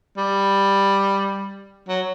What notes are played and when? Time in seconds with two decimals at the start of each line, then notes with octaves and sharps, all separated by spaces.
0.17 G3
1.88 F#3